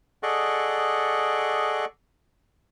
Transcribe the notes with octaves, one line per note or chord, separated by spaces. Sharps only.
G#4 A4 D5 D#5 F#5 C#6